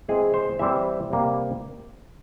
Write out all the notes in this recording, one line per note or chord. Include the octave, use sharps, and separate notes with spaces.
E3 G#3 C4 G#4
C5
E3 G3 C4 E5
C3 G3 A#3